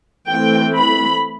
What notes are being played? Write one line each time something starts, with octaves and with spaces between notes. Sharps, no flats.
E3 A3 C4 G5
B5